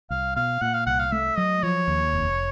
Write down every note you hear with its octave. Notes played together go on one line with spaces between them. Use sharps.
C2 F5
B2 F5
A#2 F#5
F5
C2 F#5
F5
A3 E5
F#3 D#5
F3 C#5
D#2
F1